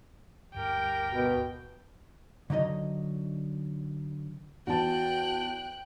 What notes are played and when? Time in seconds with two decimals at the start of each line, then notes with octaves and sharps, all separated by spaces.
0.55 D2 G2 G4 A#4 G5
1.13 B2
2.50 D3 F#3 D#4 D#5
4.67 E2 F#4 G5 A5 F#6